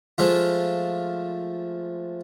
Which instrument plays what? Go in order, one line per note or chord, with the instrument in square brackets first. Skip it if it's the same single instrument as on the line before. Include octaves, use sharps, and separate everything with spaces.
[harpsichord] F3 G#3 A3 F4